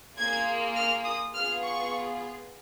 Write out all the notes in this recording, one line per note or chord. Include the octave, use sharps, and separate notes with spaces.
A#3 F4 G#4 G#6
F6
D#6
B3 F4 G#4 F6
C#6